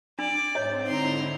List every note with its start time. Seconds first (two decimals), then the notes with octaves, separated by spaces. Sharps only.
0.19 D4 D5
0.55 G#2 C4 C#5 D#5
0.87 D3 D#4 E4 A#5 C6